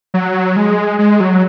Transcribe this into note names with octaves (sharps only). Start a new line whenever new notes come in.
F#3
G#3
G#3
F#3